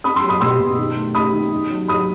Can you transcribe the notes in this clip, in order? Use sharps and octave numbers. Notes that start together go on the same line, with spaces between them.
C4 B5 D#6
C6 E6
F#3
B5 D#6
B2 C6 E6
B2
D#3
A3
A3 B5 D#6
D#3
D#3
F#3
F#3 B5 D#6